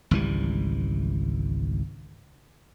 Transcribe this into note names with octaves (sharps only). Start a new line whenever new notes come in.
G#1 C#2 E3 G3